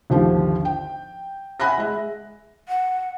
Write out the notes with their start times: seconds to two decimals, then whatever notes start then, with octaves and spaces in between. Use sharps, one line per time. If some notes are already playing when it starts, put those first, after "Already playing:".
0.10 G#1 D#2 D3 F3 G4
0.65 G5
1.60 E5 F#5 G#5 B5 F#6 A#6
1.78 G#3 E5
2.68 F#5